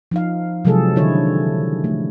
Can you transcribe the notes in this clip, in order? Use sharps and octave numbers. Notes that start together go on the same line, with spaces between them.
F3 D#4 F5
C3 F3 F#3 G#3 G#4 A4
D3 D#3 E4 C#5
A3